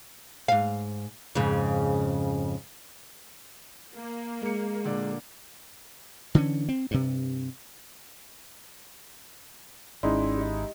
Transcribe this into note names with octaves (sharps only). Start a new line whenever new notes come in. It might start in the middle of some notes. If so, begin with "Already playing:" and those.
G#2 F5
F2 G#2 C#3
A#3
G#3 A#4 C#7
A#2 D3 D5
D3 E3 C#4
C4
G2 C3
G#1 G#3 C#4 D#4 E4 D5 C6
G4 D#5